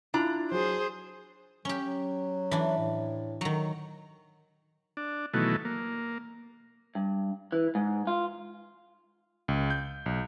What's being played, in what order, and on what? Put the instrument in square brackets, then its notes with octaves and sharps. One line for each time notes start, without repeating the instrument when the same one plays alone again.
[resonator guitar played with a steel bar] D4 A#5 [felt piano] E4 F4
[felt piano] F#3 [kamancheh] G#4 C5
[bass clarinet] F#3 [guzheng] C#4 G4
[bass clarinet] F#3
[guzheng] E3 D4
[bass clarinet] A2
[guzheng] D#3 F#3
[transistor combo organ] D4
B2 D#3 E3 F#3 A3
A#3
[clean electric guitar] G2
E3
G#2
F4
[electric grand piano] C#2
G6
B1